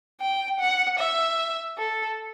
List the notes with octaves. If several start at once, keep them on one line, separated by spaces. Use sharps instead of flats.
G5
F#5
E5
A4